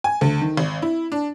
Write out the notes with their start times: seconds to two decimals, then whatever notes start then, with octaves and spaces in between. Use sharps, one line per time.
0.04 G#5
0.21 D2
0.41 D#3
0.57 G#1
0.82 E4
1.12 D4